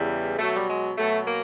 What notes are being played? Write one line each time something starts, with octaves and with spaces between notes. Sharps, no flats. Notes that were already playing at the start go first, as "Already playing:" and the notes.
Already playing: E2 C#3 E3 G3
B2 F#3 A3
G3
G#3
B2 F#3 A3
A#3